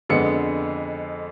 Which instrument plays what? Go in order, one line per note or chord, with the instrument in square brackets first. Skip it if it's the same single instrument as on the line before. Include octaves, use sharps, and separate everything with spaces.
[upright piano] F2 D3 G#3 B3 C#7